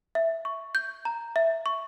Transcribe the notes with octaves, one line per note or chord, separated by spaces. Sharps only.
E5
C#6
G6
A#5
E5
C#6